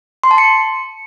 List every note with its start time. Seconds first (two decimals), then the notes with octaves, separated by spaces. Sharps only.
0.24 C6
0.31 A5
0.38 C#7